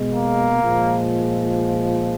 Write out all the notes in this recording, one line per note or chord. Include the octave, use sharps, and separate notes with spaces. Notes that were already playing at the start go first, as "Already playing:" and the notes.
Already playing: B2 G#3
A#3
A#2 F3 G#3